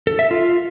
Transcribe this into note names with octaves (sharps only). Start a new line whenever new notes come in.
A4
E5
F4